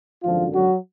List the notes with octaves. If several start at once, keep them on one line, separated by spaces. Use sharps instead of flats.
G#1 F#2 D3 F3 F4
F#3 F#4